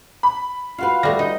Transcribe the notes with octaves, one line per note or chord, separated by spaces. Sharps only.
B5
F4 F#4 B4 F5
G3 A3 A#6
D#4 D#5